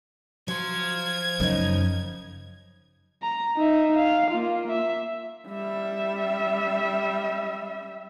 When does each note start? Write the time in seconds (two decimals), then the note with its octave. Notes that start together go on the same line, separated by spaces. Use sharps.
0.48 F3 F#3 C6 G#6
1.40 F#2 C#3 D#4
3.23 A#5
3.58 D#4 E5
3.97 F5
4.31 A#3 F4
4.71 E5
5.48 G3 E5